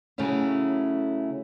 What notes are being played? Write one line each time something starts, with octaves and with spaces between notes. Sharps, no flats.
C#3 F#3 A3 C#4 E4